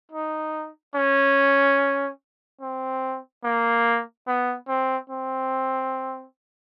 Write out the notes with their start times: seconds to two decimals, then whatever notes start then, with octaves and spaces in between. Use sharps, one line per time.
0.12 D#4
0.95 C#4
2.61 C4
3.44 A#3
4.27 B3
4.68 C4
5.10 C4